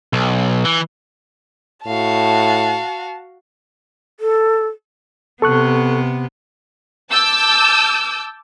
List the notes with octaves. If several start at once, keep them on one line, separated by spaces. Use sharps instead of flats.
B1
E3
A2 F#4 F5 A5
A4
C3 B3 A4 C#6 F#6
A5 D6 E6 G6